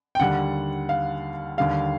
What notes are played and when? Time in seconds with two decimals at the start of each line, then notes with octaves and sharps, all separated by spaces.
0.15 G5
0.19 D#2 D3 G3 F#5
0.89 F5
1.57 D#2 D3 G3 F5